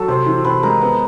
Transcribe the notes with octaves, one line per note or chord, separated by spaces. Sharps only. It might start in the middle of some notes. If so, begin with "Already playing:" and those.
Already playing: F#3 A4
C3 C5
E3
C3 B4
G#3 A#4
B3